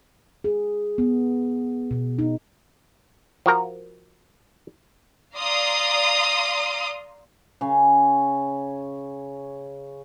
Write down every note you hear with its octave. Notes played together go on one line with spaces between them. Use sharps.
G#4
B3
B2
D#4
F3 F#4 A#4 A#5
D5 F5 A#5 C6 D#6
C#3 C#4